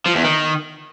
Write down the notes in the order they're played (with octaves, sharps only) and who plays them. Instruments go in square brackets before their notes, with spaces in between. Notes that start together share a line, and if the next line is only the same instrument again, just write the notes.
[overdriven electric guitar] F3
E2
D#3